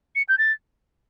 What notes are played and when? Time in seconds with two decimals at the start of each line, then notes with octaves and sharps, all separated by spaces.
0.15 C#7
0.29 G6
0.38 A6